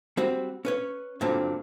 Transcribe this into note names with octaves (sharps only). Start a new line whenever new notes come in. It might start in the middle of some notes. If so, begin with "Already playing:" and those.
G3 C4 F#4
C#4 B4 C#5
G2 A#2 D3 F#3 C4